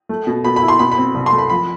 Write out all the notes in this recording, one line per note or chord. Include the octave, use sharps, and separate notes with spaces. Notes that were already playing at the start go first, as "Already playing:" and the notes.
A3
B2
B2 B5
B5
E4
C6
B2 B5
B5
C4
C2
C6
A3
B5
F3 B5